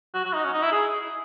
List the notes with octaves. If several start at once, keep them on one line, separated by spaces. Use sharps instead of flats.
F#4
F#4
D#4
C#4
D#4
E4
G#4